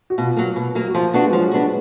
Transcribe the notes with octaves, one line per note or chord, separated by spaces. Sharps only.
F#4
B2 F4
F#3 A#3
B2
F#3 A#3
F#4
F3 F4
B3 D4 F#4
G#3
F3 F#3
B3 D4 F#4